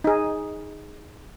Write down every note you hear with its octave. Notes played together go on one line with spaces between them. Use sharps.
D#4 G#4